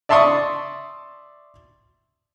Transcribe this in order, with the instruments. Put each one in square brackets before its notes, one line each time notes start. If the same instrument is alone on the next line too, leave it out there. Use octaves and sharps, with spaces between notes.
[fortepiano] D5 E5 A5 C6 C#6 D#6